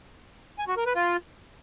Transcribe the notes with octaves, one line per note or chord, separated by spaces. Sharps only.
G#5
F#4
A#4
B4
F4